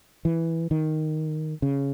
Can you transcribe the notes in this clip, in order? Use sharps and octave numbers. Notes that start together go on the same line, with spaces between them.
E3
D#3
C#3